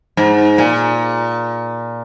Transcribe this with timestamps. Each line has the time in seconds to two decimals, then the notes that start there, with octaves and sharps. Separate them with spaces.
0.17 G#2
0.58 A#2